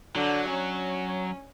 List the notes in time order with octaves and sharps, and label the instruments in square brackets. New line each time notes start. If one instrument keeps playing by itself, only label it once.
[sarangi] D3 [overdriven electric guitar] F#3
[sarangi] C#4